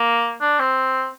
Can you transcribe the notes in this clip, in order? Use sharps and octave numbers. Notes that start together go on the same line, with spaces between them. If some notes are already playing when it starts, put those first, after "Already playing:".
Already playing: A#3
D4
C4